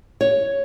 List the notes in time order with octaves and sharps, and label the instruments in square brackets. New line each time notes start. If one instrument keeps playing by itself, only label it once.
[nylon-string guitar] C#5